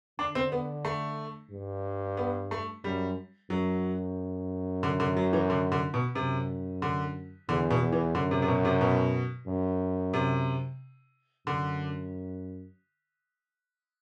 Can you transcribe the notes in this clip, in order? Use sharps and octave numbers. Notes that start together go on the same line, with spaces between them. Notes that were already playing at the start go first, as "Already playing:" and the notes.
D3 D4
C4
B3
A3
G2
B3
A3
F#2 G3
F#2 F#3
D3
D3
F#3
E3
D3
D3
B2
F#2 C3
D3
E2 D3
B2
E2
E3
F#2 D3
C3
C3
B2
C3
B2
F#2
C3
F#2 D3